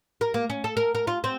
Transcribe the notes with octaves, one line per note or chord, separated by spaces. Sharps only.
A#4
A#3
C#4
A4
A#4
A#4
F4
C4